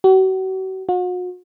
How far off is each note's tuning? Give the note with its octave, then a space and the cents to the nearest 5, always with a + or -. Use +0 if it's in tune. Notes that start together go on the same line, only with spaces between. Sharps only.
F#4 +40
F#4 -40